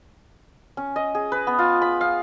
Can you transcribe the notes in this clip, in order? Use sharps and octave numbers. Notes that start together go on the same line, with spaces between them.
C#4
D#5
G#4
B4
B3
F4
B5
F5